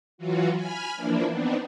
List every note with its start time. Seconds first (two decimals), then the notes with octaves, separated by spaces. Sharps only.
0.18 E3 F#3 F4 F#4
0.54 G#5 B5 F6
0.96 E3 F3 A#3 D4 E4
1.27 B3 C4 D4 D#4